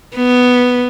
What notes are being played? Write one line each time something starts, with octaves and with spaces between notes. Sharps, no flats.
B3